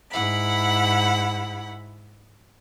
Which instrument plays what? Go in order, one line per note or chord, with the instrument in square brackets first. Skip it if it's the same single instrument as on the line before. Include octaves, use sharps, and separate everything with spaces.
[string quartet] G#2 E4 F#5 B5